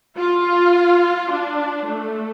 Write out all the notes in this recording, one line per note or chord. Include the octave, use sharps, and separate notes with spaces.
F4
D4
A3